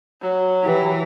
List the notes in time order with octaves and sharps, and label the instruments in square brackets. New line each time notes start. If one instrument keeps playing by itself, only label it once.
[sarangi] F#3
[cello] E3 [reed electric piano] E4 G4 B4